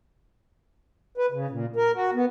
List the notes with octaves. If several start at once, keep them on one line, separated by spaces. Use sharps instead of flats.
B4
C#3
A#2
A#4
F#4
B3